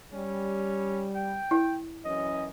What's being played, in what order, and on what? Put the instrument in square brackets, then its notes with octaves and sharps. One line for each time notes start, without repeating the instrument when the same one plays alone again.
[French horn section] G3 [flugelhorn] C#4
[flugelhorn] G5
[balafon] E4
[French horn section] F#2 E3 C#4 [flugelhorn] D#5